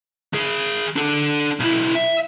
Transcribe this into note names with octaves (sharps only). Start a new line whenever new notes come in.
D#3 G#4
D4 A4
B1 E4
E5